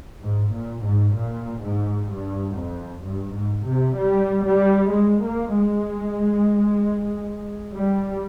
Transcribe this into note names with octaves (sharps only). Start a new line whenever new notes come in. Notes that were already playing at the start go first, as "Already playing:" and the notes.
G#2
A#2
G#2
A#2
G#2
G2
F2
G2
G#2
C3
G3
G3
G#3
A#3
G#3
G3